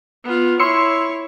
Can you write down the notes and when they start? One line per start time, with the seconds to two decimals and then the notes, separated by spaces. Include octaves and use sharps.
0.24 B3 F4
0.60 E4 C#5 C6 E6 C#7